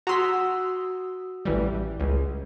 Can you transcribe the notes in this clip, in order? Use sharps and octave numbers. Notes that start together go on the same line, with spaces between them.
F#4 A#5 C6 D#6 E6 B6
A1 E3 G3
C#2